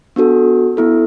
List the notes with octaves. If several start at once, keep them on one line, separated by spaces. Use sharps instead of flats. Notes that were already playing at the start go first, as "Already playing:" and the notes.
B3 D4 F#4 A4
B3 E4 A4